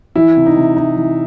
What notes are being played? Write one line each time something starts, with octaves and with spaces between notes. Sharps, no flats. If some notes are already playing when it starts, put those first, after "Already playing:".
E3 E4
C3
D#4
C3
E3 D#4
E3